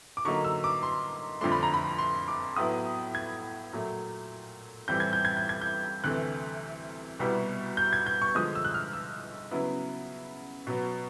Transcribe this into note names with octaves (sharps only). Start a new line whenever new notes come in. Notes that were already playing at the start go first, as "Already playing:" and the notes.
D6
D3 F#3 A#3 D#4 C#6
E6
D6
C6
F2 D3 F3 A3 D4 C6
B5
A#5
B5
C6
D6
A2 F#3 B3 E4 D#6
G#6
A#2 F#3 A3
A2 E3 G3 C4 E4 G6
G#6
G6
G#6
G6
G#6
G6
D2 C3 E3 A3 F#6
C2 B2 G3 B3 E4
G6
G#6
G6
C#6
D3 F3 G#3 D#6
E6
F#6
F6
E6
C#3 F#3 B3 E4
B2 F#3 B3